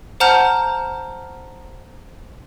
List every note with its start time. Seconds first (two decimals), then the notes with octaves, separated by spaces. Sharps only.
0.20 C5 F#5 A5 A#5 F6 G6